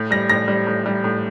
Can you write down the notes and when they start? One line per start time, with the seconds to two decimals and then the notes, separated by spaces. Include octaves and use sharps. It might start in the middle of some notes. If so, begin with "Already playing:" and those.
Already playing: A2
0.11 G3 A#6
0.30 A2 A#6
0.48 G3
0.67 A2
0.86 G3
1.04 A2